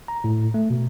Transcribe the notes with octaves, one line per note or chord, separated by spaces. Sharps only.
A#5
A2
A3
B2